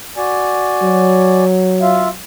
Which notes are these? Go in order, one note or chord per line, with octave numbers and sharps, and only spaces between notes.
F#4 D5 G#5
F#3
F4 E5 F5